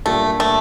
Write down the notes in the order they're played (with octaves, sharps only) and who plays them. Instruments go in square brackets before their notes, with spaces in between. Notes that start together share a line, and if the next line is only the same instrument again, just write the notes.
[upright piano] A#2 G3 A#3 D4 G4 [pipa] A3
[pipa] A3